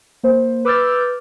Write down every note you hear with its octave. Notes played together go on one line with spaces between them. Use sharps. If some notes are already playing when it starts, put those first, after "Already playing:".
A#3 C5
B4 D6 E6 F6 G6 A6